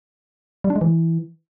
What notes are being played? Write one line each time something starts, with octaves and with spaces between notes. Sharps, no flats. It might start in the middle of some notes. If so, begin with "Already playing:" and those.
G3
D4
G#3
E3